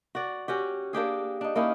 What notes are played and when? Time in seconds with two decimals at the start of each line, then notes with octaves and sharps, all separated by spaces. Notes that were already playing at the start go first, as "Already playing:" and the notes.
0.15 F#4 D5
0.48 C#4 F#4 G4
0.93 A#3 D4 G4 G#4
1.41 D4 D#4
1.56 A#3 C#4 D#4 E4